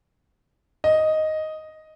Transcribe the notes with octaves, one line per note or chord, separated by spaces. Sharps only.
D#5